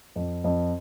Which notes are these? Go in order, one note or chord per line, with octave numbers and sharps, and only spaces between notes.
F2
F2